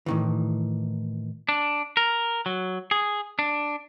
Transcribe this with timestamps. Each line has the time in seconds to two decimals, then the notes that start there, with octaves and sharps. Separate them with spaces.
0.06 A2 D#3 E3
1.49 D4
1.97 A#4
2.46 F#3
2.91 G#4
3.39 D4